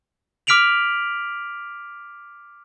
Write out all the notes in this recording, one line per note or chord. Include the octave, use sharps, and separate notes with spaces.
D6 F6 B6 D7 F7 F#7